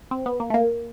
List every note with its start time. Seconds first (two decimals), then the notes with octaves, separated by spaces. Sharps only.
0.11 C4
0.26 B3
0.40 A#3
0.50 A3
0.54 A#3